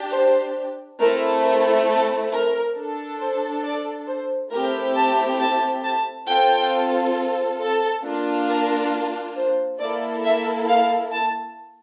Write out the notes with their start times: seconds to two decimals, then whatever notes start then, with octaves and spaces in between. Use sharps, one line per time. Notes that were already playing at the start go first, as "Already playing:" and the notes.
Already playing: D4 G4
0.11 C5
0.99 A3 C4 E4 A4 A#4
1.43 A#4
1.87 A4
2.32 A#4
2.76 D4 A4
3.19 C5
3.63 D5
4.07 C5
4.51 A3 C4 E4 G4 A#4
4.95 A5
5.40 A5
5.84 A5
6.27 C4 F4 A4 G5
7.60 A4
8.04 A#3 D4 F4
8.48 A#4
9.36 C5
9.79 A#3 E4 A4 D5
10.24 E5
10.68 F5
11.12 A5